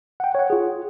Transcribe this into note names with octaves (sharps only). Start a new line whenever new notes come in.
F#5 G5
C#5 F#5
F4 G#4